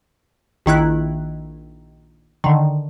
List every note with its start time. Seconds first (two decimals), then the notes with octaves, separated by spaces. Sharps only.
0.66 A#1 D#3 E4 F#6
2.44 D3 D#3